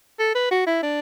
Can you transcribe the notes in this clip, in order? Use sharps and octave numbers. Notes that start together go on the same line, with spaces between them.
A4
B4
F#4
E4
D4